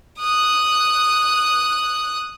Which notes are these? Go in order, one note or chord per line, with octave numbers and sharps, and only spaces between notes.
D#6 F#6